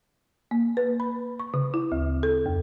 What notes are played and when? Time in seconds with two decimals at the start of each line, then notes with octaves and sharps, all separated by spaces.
0.51 A#3
0.77 B4
1.00 B5
1.40 C#6
1.54 C#3
1.74 E4
1.92 D2
2.23 A4
2.46 F2